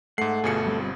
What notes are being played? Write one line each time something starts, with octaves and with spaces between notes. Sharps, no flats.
G#2 A3 F#5 C7
G1 B2 F4 G#4 C#7
G3 C4 F4